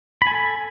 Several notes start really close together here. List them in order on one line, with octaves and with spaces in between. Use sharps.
B5 G#5 A4